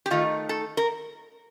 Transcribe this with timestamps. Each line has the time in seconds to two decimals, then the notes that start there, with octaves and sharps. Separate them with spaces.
0.06 G4
0.10 D#3 A3 D#4 F4
0.49 A4
0.77 A#4